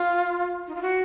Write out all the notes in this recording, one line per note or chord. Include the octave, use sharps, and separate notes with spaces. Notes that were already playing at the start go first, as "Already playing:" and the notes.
Already playing: F4
D#4
F4
F#4